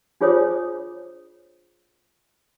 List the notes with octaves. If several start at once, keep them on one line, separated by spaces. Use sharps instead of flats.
D4 F4 G#4 C5 C#5 D#6